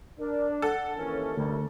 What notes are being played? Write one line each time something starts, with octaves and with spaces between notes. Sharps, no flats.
D4 A#4
A4 F#5
D#2 E3 C#4 A#4
A1 D2 C3 G3